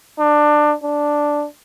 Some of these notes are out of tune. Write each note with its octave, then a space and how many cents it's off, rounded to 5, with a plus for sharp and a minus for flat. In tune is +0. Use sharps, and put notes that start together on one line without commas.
D4 +20
D4 +0